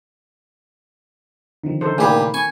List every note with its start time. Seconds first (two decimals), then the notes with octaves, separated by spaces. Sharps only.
1.63 D3 D#3 F3 C4 D#4
1.81 C#3 D4 D#4 A4 C5
1.98 A#2 D#3 E3 A3 G4 G#4 B5
2.34 C4 G#5 C#6